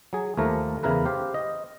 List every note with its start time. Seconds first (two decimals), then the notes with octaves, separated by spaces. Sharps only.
0.13 F#3 G#4
0.37 D#2 F3 A3 A#4
0.83 E2 C#3 E4 A#4 B4
1.05 G4 C5 F5
1.34 D#5